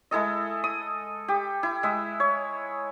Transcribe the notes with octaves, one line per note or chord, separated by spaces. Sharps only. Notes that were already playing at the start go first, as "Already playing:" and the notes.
G#3 E4 A4 D#5
D#6
G4
E4
G#3 E5
C#5